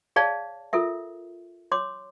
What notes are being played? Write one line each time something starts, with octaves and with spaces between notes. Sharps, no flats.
G#4 C#5 D5 F5 A5
F4 A4 A#4 E5
C#5 C6 D6